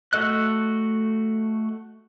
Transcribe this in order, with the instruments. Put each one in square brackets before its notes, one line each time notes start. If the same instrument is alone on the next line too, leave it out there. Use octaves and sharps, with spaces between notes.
[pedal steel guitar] A3 F#4 A4 D#5 F#6